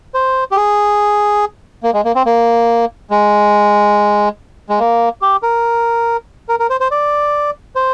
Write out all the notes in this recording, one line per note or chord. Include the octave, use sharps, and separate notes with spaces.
C5
G4
G#4
A#3
G#3
A#3
C4
A#3
G#3
G#3
A#3
G4
A#4
A#4
A#4
C5
C5
D5
C5